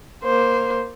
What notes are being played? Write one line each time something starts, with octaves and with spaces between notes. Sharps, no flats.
A#3 C5